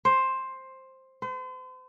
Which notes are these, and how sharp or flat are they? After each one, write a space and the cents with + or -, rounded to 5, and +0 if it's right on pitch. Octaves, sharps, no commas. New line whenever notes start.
C5 +10
C5 -40